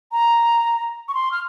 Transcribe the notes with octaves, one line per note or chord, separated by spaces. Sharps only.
A#5
C#6
C6
F6